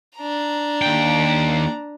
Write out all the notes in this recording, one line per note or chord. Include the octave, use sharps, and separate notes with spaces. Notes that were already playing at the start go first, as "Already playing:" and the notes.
D4 A#5
D#2 G5